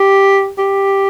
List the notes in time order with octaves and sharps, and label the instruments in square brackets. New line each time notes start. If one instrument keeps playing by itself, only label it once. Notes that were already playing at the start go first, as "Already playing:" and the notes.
Already playing: [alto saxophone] G4
G4